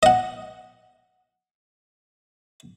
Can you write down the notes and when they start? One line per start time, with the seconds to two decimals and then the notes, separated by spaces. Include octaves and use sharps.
0.03 D#5 F#5